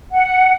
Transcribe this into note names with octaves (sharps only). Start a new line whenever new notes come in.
F#5